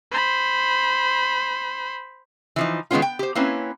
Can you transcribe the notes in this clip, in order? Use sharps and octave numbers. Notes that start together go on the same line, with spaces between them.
C5 B5
E3 F3 D#4
D#3 G#3 A3 B3 C#4 F4
G5
G4 C5
A#3 C4 C#4 E4 B4